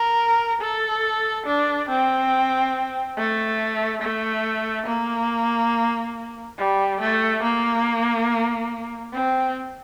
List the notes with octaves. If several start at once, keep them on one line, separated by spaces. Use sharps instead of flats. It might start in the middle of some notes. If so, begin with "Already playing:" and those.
Already playing: A#4
A4
D4
C4
A3
A3
A#3
G3
A3
A#3
C4